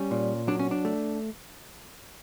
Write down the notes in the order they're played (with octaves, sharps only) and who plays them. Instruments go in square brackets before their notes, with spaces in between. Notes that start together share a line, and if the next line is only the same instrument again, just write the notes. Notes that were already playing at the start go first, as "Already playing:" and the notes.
Already playing: [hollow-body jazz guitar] G3 C#4
A#2
F#3 D4
C#4
D4
A3